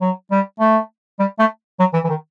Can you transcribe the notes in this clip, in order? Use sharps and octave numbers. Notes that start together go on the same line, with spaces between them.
F#3
G3
A3
G3
A3
F#3
E3
E3
D#3